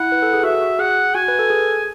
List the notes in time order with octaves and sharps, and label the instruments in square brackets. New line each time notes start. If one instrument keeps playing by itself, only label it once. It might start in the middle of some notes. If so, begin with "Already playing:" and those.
Already playing: [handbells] E4 [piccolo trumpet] F#5
[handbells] B4
A4
G#4
[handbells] F#4 [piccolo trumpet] E5
[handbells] F#4
[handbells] G#4 [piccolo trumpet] F#5
[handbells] F#4 [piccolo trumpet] G#5
[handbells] B4
A4
G#4